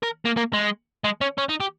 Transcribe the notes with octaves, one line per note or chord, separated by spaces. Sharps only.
A#4
A#3
A#3
G#3
G#3
C#4
C#4
D#4
G4